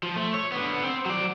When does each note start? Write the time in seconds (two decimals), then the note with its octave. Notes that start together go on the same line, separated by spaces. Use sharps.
0.03 F3
0.16 A3
0.34 C#5
0.52 D3 B3
0.84 C4
1.06 F#3 D5